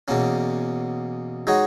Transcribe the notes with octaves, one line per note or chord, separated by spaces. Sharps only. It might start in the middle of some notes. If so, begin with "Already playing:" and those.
E2 B2 A#3 C#4
G#3 D#4 F#4 C#5